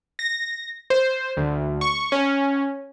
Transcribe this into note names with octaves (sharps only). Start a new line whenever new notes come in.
A#6
C5
D2
C#6
C#4